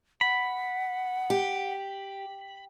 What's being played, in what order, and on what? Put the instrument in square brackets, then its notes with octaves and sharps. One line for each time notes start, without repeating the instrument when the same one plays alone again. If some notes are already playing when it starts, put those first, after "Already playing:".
[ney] F#5 [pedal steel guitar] B5
[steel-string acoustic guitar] G4